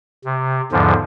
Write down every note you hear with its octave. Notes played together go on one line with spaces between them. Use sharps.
C3
E2 G#2 D3 F3